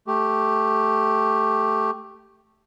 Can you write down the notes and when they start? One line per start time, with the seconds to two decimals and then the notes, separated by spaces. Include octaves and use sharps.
0.07 A3 G4